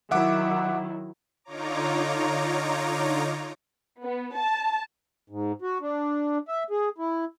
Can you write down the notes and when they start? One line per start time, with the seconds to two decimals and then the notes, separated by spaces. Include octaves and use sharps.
0.11 D#3 F#3 E4 E5 F#5 D6
1.44 D3 D#4 F4 C#5 A#5 D6
4.03 B3
4.36 A5
5.30 G#2
5.62 F#4
5.81 D4
6.48 E5
6.70 G#4
6.98 E4